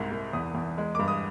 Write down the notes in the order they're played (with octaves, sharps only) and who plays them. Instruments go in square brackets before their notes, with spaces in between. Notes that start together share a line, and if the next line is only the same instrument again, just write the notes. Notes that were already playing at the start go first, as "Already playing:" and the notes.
Already playing: [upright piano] C2 G#2
C2
E2 D#6
E2
G#3
G2 D6
D#6